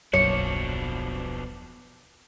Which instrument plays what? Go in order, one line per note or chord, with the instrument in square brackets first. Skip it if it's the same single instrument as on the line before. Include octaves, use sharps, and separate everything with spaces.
[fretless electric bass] D#1 B1 F#2 [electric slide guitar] B2 F3 D4 [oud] C#5 [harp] C#7